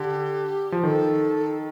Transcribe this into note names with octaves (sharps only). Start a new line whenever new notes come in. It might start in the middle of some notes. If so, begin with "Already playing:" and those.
Already playing: D3 G4
F3
D#3 A4